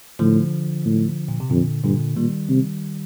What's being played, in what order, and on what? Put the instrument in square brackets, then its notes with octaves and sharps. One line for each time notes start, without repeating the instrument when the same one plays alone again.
[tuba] A2 [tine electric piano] D3 F3
[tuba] A2
[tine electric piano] A#2
C3
[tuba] F2 [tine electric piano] A#2 D3
[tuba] G2 [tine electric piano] A#2 D3
[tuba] A#2 [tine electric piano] D#3 G3
[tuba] C3